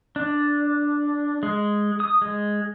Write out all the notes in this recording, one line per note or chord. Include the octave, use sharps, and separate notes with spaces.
D4
G#3
D#6
G#3